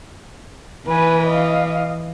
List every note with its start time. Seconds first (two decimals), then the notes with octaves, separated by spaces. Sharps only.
0.88 E3 B4 G#5
1.27 D#5 F5